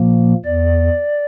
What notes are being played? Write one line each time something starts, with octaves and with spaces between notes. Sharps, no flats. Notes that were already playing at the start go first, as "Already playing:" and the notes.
Already playing: A#2 F3 A#3
E2 D5